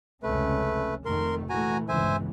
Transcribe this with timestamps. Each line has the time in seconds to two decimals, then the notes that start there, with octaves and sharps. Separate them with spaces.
0.23 F1 C#2 A3 C#4 B4
1.06 F1 D#3 A3 A#4 C6
1.49 A#2 E3 A3 F#4 G#5 A#5
1.89 G1 C#2 E3 C5 E5 G#5